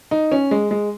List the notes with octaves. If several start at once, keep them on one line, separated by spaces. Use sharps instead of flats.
D#4
C#4
G#3
G#3